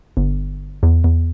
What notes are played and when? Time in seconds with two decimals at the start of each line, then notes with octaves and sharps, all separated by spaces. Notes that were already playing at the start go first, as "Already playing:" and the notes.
0.17 G1
0.83 E2
1.04 E2